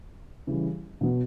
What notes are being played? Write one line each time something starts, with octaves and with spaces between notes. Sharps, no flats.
C#3 E3 G3
B2 F#3 B3